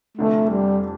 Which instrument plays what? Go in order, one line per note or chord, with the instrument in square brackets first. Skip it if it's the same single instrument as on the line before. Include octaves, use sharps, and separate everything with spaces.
[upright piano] F1 F2 D3 [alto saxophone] A3
[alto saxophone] G3